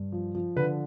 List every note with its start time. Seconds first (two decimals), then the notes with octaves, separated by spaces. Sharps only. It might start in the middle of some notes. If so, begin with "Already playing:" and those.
Already playing: G2
0.12 F3
0.35 F3
0.56 D3 B4